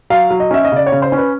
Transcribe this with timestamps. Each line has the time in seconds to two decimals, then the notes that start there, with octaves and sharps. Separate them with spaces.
0.10 F#3 F5
0.30 F#3
0.40 D#5
0.51 C#4 E5
0.65 D#5
0.72 C#3 D5
0.86 C#5
0.92 C#3
1.02 C5
1.12 C#4
1.17 B4